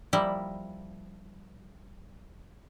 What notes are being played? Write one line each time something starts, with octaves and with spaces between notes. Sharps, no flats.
F3 G3 A#3 E4